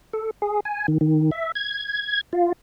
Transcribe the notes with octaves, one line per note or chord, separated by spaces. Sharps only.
A4
G#4
G#5
D#3
D#3
E5
G#6
F4